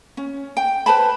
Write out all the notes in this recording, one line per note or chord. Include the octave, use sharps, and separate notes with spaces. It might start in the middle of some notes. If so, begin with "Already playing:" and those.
C#4
G5
B4 C5 A5 B5